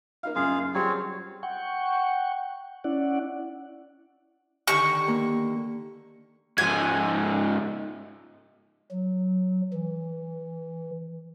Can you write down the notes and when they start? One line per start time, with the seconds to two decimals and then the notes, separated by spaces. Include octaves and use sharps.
0.23 A#3 D#4 F5
0.35 F#2 C#3 F4 G#4 F5
0.74 F#3 G3 C4 G#4 C#5
1.43 F#5 G5 C#6
2.84 C#4 E4 D5 F#5
4.68 D3 D#3 G4 C#6
5.08 A#3
6.58 G#2 F3 G#5
8.91 F#3
9.73 E3